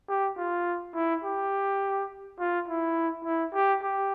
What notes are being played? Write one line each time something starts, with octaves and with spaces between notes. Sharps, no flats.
G4
F4
E4
G4
F4
E4
E4
G4
G4